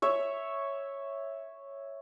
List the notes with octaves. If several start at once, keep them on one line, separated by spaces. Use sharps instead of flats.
C#5 E5